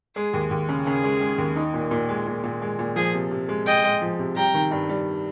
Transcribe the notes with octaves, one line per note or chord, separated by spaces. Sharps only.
G#3 G#4
D#2
D#2
C#3
C#3 G#4
G#3
G#3
D#2
D#4
A#2
A#2
G#3
A#2
A#2
G#3
A#2
F3 G#4
C3
C3
G#3
G#3 D#5 G5
G#3
F3
C3
G3 G5 A#5
D#3
G2
G3